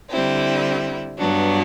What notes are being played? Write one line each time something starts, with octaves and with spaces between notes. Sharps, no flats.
D3 G3 C4 E4
G2 F#3 B3 D4